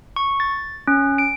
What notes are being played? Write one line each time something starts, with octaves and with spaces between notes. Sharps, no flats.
C#6
A6
C#4
D7